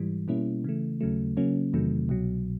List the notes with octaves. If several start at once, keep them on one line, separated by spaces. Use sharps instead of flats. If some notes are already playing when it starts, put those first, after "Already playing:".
Already playing: G#2 E3 G3
B2 G3 A#3 C#4 E4
C#3 E3 A3
D#2 C#3 F#3 A3
C#3 F#3 A#3 C#4
E2 C3 D#3 F#3 A3
C2 B2 F#3